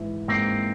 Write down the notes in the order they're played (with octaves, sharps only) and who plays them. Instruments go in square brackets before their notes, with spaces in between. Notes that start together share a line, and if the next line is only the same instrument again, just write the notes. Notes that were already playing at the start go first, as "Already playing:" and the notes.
Already playing: [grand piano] G#2 E3
[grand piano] G#2 [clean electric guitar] A#3 C4